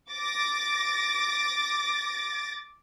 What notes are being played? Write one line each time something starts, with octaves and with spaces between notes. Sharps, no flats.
D6 A6 A#6